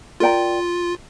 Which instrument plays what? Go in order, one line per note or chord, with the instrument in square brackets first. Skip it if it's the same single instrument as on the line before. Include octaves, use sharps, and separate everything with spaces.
[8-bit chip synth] F4 [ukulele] A#4 D5 G5 A#5